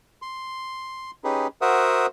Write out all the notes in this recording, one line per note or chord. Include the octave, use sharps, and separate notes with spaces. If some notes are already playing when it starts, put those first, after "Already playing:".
C6
C#4 D#4 G4 G#4 B4
F#4 A#4 C5 E5 F#5 D#6